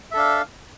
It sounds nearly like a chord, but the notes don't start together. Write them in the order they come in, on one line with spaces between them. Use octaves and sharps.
E5 A4 D4 F5